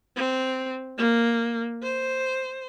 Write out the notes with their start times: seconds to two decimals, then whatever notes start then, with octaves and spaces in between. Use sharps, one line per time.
0.16 C4
0.97 A#3
1.82 C5